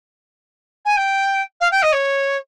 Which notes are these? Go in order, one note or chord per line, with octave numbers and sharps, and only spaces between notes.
G#5
G5
F5
G5
D#5
C#5